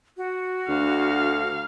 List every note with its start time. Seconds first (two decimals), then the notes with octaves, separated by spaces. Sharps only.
0.17 F#4
0.69 D2 D3 F5